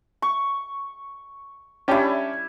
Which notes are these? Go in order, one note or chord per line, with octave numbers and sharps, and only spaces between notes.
C#6
G3 C#4 D4 E4 G4